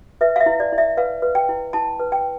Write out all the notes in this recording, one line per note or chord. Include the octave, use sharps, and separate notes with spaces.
B4 E5
F5
E5
E4
D5
E4
E5
B4 F5
B4
G5
E4
E4 A5
B4
G5